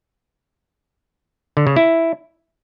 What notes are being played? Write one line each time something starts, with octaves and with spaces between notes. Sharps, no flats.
D3
C#3
E4